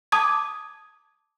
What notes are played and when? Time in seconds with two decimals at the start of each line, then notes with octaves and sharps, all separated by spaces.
0.12 A5 D6 D#6 G#6